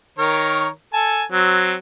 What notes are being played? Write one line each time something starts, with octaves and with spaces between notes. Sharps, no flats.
D#3 A#4 C#5
A4 G#5 A5
F#3 C4